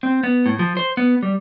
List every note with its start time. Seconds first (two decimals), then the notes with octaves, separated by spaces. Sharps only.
0.03 C4
0.23 B3
0.46 A2
0.59 F3
0.77 C5
0.97 B3
1.23 G3